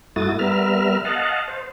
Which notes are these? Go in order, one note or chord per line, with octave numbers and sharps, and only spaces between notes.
G2 A3 E4 F#4 D#6 A6
G3 B3 A#4 E5 F6
D#5 F5 F#5 A5
C5